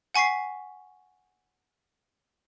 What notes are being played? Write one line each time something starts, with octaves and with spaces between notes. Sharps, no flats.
F#5 G#5 C#6 B6 C7